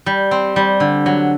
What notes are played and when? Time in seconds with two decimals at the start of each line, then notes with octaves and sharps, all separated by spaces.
0.06 G3
0.31 C4
0.56 G3
0.80 D3
1.06 F#3